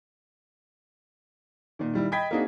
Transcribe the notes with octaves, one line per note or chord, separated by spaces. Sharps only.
A#2 D#3
D#3 G3 E4
D#5 G5 B5 G#6 B6
A#3 C4 D4 D#4 F#4 G#4